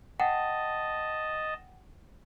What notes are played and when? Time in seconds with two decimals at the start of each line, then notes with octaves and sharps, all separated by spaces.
0.20 D#5 F#5 G5 A5